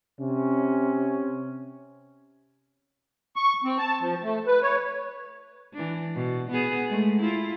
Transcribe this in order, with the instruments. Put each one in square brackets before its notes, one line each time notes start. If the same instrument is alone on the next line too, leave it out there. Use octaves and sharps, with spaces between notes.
[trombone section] C3 C#4
[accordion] C#6
C4
A5
F3
A3
B4
C#5
[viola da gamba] E3 D4
B2
B3 G#4
G#3 A3
E4 F4